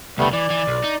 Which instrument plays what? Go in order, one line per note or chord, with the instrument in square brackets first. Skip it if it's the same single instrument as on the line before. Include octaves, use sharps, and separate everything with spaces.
[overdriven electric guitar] C2 D3 [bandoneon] G3 A3 B3
[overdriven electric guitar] E3 [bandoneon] D5
[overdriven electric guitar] E3
B1
D#4